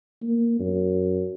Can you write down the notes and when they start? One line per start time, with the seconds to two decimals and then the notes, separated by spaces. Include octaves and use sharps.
0.22 A#3
0.60 F#2